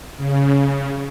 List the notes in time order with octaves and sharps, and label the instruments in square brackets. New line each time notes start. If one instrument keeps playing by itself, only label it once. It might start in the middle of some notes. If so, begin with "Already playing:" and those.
[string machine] C#3